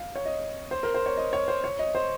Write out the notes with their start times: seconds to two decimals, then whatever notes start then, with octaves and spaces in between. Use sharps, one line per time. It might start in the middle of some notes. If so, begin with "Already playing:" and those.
Already playing: F5
0.16 C#5
0.26 D#5
0.71 C5
0.83 A#4
0.94 C5
1.06 C#5
1.17 D#5
1.33 C#5
1.48 C5
1.64 C#5
1.79 D#5
1.95 C5